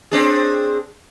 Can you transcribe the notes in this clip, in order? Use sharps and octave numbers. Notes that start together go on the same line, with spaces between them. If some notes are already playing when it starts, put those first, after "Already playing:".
C4 D4 G#4